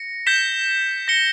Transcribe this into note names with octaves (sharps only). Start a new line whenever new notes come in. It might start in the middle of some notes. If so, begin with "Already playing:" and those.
Already playing: A#6 C#7
G6 B6 E7 G7
A#6 C#7 G7